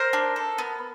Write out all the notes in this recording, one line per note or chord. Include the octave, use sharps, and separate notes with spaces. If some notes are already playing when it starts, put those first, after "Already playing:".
Already playing: A#4 C5
D4
A4
B3